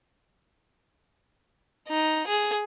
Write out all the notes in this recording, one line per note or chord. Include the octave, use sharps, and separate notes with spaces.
D#4
G#4